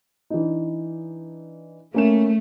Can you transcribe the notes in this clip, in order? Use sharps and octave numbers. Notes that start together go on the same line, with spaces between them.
E3 D4 D#4
A3 A#3 C#4 E7